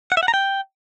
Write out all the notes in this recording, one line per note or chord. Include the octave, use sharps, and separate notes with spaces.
F#5
E5
F#5
A#5
G5